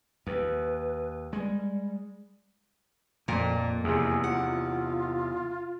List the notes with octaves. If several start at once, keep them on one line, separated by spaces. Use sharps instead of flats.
D#2 B4
G3 G#3
F2 A#2 A#3
E2 C3 G#4
F4 F#5